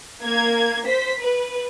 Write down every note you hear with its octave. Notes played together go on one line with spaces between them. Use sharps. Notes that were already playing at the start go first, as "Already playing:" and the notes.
A#3 G#6
C5 B6
B4